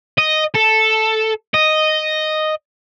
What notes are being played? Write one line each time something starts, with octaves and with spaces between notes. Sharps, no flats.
D#5
A4
D#5